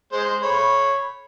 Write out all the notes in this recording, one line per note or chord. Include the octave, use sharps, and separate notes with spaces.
G#3 C5
C#5 B5